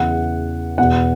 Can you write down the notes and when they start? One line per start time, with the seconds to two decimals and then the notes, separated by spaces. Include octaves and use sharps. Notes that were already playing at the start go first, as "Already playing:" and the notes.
Already playing: E2 C#3 E3 F#5
0.78 E2 B2 F#5